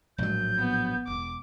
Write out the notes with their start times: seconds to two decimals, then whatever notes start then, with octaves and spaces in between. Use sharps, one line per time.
0.18 A#1 A2 F#3 G#3 G6
0.58 B3
1.07 E1 E4 D6